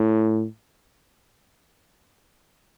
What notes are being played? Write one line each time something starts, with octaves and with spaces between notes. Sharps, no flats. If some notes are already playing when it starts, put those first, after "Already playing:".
Already playing: A2